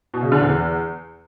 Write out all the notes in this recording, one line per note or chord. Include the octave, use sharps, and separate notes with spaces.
B2
C#3
D3
E2